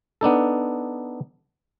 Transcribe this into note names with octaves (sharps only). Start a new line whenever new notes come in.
B3 D4 D#4 A4